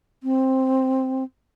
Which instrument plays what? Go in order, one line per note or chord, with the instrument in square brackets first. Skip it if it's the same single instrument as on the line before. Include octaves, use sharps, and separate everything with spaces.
[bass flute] C4